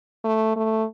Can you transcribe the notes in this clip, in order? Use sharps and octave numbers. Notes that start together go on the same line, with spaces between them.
A3
A3